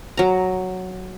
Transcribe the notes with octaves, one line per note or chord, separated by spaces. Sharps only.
F#3 A#5